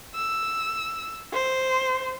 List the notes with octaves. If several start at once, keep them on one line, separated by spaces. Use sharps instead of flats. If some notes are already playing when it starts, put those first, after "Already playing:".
E6
C5